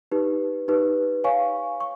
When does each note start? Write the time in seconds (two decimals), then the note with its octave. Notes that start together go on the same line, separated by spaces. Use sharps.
0.12 D#4 G4 B4
0.68 D#4 G4 B4
1.24 C#5 F5 G#5 C#6
1.80 C#6